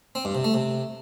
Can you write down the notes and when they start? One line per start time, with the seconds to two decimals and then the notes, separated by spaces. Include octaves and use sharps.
0.15 C4
0.25 G2
0.35 C3
0.44 A3
0.54 C3